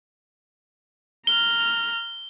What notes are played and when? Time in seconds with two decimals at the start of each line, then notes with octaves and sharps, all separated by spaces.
1.27 A#5 F6 G7